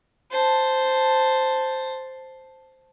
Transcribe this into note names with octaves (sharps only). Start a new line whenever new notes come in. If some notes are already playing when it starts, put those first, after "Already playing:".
C5 A5